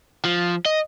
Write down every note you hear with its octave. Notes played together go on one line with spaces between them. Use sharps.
F3
D#5